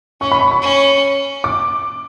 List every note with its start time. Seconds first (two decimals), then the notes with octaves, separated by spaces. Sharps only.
0.21 C#4 C#6
0.32 B5
0.41 C#6
0.51 C#6
0.61 C#4
1.44 D6